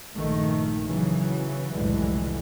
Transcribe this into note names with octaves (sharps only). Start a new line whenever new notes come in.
A#1 G2 D#3 A3
C#3 E3 F#3
C2 F2 A2 D3 E3 G#3